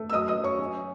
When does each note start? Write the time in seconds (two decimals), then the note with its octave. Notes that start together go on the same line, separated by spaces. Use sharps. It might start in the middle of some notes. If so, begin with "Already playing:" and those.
Already playing: A3
0.09 E6
0.13 F#2 D#5 D#6
0.28 D#5 D#6
0.36 F#2
0.43 C#5 C#6
0.59 C#4